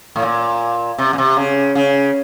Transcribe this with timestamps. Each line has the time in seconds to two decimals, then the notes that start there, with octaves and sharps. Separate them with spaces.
0.16 A2
0.22 A#2
0.98 C3
1.13 A#2
1.18 C3
1.37 C#3
1.75 C#3